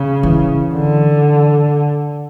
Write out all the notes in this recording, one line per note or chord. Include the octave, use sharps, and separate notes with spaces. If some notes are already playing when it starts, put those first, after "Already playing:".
Already playing: C#3
E3
D3